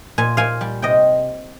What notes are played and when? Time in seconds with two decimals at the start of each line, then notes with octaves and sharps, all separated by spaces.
0.18 A#2 G#5
0.37 A#2 F5 G#5
0.61 G3
0.82 C3 D#5 G5